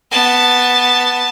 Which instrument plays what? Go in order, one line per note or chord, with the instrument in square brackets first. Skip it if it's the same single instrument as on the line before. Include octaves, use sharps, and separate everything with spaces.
[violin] B3 A5